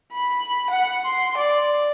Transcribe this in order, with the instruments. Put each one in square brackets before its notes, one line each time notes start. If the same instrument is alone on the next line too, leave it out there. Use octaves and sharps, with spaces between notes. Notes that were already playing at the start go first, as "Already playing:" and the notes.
[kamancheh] B5
F#5
C6
D5